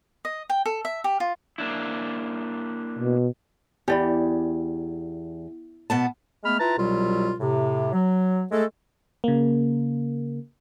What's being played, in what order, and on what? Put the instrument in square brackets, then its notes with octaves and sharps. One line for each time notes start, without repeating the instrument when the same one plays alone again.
[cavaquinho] D#5
G5
A4
E5
G4
F4
[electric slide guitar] A#3 D4 E4
[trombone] B2
[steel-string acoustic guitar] E2 [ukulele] G4 D5 B5
[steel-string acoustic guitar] B2 B3 A5
[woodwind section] G#3 A3 B3 B5 F6
E4 F4 B4 A5 A#5
C2 B2 F#3 G3 F4
A2 C3
F#3
G#3 A3 A4
[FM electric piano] C#3 A#3